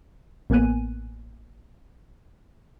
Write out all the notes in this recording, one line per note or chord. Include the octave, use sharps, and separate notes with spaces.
A1 A#3 B3 G#5 F#6 D#7